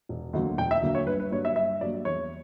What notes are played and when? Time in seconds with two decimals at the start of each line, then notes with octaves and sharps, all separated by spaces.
0.09 E1
0.33 D2 D3 F#3 A#3
0.58 E1 G5
0.71 E5
0.83 D2 D3 F#3 A#3
0.95 C#5
1.07 G1 B4
1.20 B4
1.31 G2 F#3 A#3 C#5
1.45 E5
1.56 G1 E5
1.81 G2 F#3 A#3 D5
2.05 E2 C#5